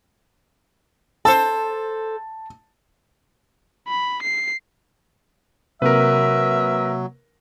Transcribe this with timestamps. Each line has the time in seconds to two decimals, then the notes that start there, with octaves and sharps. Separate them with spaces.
1.25 A4 C5 A5
3.87 B5
4.23 C7
5.82 C3 F#3 A#3 A#4 B4 E5